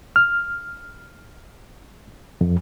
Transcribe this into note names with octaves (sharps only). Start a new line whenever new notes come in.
F6
F2